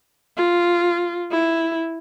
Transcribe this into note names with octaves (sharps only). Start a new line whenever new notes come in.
F4
E4